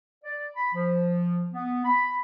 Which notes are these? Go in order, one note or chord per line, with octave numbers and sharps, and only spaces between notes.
D5
B5
F3
B3
B5